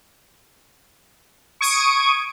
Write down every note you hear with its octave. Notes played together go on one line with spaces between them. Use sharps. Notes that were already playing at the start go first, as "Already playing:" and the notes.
C#6 D#6 G#6 D7 D#7